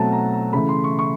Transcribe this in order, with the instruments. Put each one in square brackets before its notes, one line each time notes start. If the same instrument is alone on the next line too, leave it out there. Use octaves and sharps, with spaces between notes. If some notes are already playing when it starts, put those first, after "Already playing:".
Already playing: [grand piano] B2 F#3 A3 C4 F#5 A5 A#5
A#5
A#5
C#3 E3 A3 B5
C6
C#6
C#6